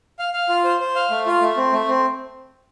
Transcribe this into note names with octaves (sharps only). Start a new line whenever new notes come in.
F5
F5
F4
C5
C5
F5
A3
F4
A3
C4
A3
C4